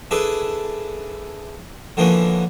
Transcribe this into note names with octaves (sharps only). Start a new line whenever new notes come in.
D4 E4 G#4 A4 B4
D3 E3 F3 A#3 B3 C#4